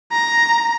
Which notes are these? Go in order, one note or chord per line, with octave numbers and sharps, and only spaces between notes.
A#5